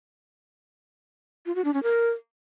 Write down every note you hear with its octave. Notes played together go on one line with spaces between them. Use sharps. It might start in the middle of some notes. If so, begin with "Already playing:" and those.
F4
F#4
D4
C#4
A#4